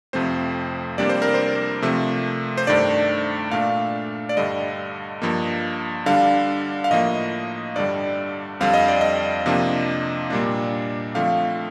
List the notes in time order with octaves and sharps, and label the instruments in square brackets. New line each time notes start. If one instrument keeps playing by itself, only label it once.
[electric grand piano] F2 C3 F3 A3 C4 C5
F2 C3 G3 A#3 D4 D5
C5
A#4
C5
C3 F3 A3
C5
G2 D#3 A3 D4 D5
A#2 A3 D4 F5
D5
G2 D3 G3 D#5
G2 F3 A#3
D3 G3 D4 F5
F5
A2 F3 A#3 D#5
G2 D3 G3 D5
F2 D3 G3 C4 F5
D#5
D5
D#5
C3 F3 A#3 D4
A#2 G3 A#3 D4
D3 F3 A3 C4 F5